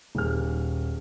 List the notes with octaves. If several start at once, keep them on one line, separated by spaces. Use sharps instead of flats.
D#1 G#4 F6